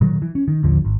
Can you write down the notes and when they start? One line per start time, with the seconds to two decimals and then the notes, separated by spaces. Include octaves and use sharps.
0.01 A#2 D#3 F#3
0.22 E3
0.35 C#4
0.48 D#3
0.63 A1 D#2 D3 F3
0.85 G#1